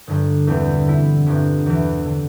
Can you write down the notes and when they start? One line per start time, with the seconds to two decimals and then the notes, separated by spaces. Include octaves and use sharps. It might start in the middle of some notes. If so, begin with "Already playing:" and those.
0.07 G1 G2 D3 G3
0.47 E1 E2 D3 C4
0.87 D3 C4 E4
1.26 G1 G2 E3 C4
1.66 E2 C3 E3
2.06 D3